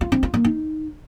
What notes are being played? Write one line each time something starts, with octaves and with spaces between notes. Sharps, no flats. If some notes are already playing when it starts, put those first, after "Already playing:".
F4
C4
F4
A#3
D#4